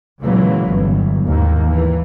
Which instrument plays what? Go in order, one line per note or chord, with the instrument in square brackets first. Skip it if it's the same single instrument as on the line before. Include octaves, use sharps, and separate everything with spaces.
[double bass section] A#2 C#3 E3 F#3 G#3 A#3
G1 F#2
D#2 G#2 D#3 A#3
E3